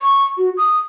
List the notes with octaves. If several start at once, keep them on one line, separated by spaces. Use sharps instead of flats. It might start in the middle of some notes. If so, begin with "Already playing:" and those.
C#6
F#4
D#6